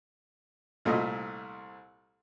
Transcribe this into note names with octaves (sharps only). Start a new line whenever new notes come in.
C2 A#2 A3 D#5